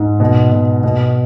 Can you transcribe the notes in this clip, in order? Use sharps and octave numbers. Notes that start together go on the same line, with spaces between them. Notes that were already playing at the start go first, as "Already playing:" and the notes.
Already playing: G#2
B2
B2
B2